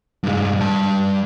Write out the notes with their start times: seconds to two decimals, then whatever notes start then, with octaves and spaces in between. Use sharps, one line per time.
0.23 G2 G#3
0.57 G3 A5